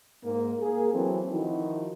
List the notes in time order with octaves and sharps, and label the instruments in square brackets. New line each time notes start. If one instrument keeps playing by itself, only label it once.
[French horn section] G#2 G#3 A#3
A#3 G#4
E3 F#3 C4 A4
D#3 F3 D#4 E4 F#4